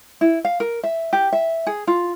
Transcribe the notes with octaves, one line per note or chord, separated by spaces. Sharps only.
E4
F5
A#4
E5
G4
E5
G#4
F4